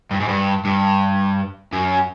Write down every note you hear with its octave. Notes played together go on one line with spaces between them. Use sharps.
G2
G#2
G2
G2
F#2